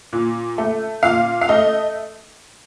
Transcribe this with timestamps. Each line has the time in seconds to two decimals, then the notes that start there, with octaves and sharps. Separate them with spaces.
0.13 A#2
0.58 A3
1.03 A#2 F5
1.41 F5
1.49 A3 D#5